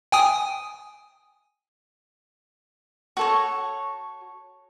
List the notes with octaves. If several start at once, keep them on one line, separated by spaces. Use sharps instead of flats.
G5 G#5 D#6
F#4 A4 C#5